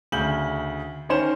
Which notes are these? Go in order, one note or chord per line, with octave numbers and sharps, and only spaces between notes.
D2 C#3 G6 F#7
D#3 C#4 C5 E7